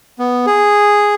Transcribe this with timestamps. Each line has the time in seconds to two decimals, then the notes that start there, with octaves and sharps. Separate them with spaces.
0.19 B3
0.46 G#4